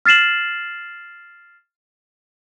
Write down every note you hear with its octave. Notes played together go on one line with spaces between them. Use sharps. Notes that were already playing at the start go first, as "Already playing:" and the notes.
F6 A6 C7 E7 F#7